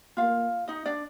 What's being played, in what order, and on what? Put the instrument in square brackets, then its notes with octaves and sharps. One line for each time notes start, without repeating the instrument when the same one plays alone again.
[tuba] A#3 [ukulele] F4 F5
[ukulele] D#4 D#5
D4 D5